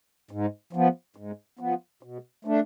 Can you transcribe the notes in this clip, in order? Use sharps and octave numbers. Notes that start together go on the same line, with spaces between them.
G#2
F3 B3
G#2
F3 B3
B2
A3 D4